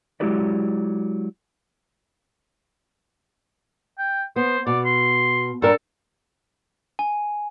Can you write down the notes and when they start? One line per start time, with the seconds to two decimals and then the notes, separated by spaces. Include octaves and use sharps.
0.20 F#3 G#3 E4 G4 B4 D5
3.98 G5
4.36 B3 C5
4.67 B2 D5
4.86 C6
5.62 G2 A4 A#4
6.99 G#5